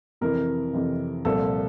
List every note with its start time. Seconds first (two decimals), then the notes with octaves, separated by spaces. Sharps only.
0.21 F2 C3 E3 A#4
0.73 F2 C3 E3
1.25 C2 A#2 F3 A4